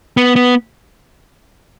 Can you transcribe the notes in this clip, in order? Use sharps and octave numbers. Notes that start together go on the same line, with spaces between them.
B3
B3